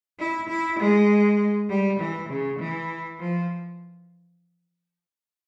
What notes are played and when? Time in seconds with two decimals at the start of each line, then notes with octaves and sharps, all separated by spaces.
0.19 E4
0.49 E4
0.79 G#3
1.70 G3
1.99 E3
2.30 C#3
2.60 E3
3.20 F3